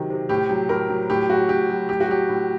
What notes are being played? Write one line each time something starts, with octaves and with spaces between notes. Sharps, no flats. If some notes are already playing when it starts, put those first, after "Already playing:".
Already playing: C3 D#3 F#3
C3
A2 G4
F#3
A2 A#4
F#3
A2 G4
F#3 F#4
A2 G4
F#3
A2 G4
F#4
F#3 G4
A2